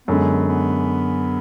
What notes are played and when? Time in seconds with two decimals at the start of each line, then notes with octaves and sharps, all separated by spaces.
0.08 F#2 D3 G#3 B3
0.48 B3